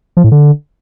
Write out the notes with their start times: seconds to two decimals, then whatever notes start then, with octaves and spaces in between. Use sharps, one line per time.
0.17 F3
0.24 A2
0.32 D3